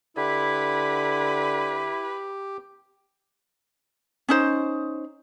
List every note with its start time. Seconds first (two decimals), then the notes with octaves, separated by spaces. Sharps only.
0.17 D3 E4 G4 B4
4.29 C#4 D#4 C5